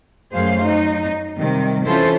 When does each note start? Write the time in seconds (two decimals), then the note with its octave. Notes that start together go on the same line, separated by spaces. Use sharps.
0.33 F#2 F#3 A3 G#4 C5 F5
0.63 F#3 D#4
1.37 C3 D#3 G3
1.86 E3 C#4 E4 F4 A4 C5